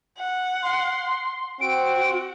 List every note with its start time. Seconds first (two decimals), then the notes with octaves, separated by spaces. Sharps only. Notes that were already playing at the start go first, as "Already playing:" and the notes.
0.18 F#5
0.63 C6
1.61 C4 F#4 D7